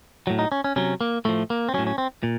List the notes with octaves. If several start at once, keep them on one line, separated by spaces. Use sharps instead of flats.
A2 F#3
D#4
C#4
C#4
C3 F#3 C#4
A#3
A2 F3 A3
A#3
C4
A2 F#3 C#4
C#4
C4
A#2